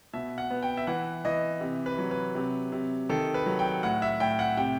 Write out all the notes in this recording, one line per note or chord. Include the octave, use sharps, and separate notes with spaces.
B2 E5
F#5
B3
G5
E5
E3 F#5
E3 D#5
C3
B4
F#3
B4
C3
C3
D#3 A4
B4
F#3
G5
A2 F#5
E5
A2 G5
F#5
C3 G5